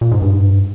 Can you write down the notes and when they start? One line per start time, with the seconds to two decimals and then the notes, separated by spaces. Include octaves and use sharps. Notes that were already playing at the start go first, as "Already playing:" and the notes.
0.01 A#2
0.12 G#2
0.22 G2